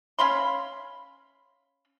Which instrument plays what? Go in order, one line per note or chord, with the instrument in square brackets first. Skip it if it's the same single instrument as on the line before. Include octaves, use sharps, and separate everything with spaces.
[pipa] C#4 F5 B5 C6